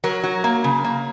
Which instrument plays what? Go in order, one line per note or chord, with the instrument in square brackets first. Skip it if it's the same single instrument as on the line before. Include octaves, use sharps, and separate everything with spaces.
[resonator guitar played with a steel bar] F#3 A#4
F#3
A#3
C#3
A#3